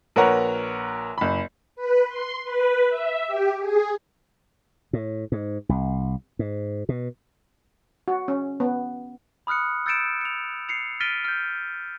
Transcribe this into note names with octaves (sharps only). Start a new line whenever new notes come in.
A#1 A#4 B4 C#5 F#5 A#5
F#1 B5
B4
C6
B4
E5
G4
G#4
A2
G#2
C2
G#2
B2
F#4
C#4
B3
B5 D#6 F6 F#6 C#7
E6 G6 A6 C#7 D7 E7
C#7 F7
C7 C#7 F7
F6 A6 B6 D7 D#7 G7
F6 G6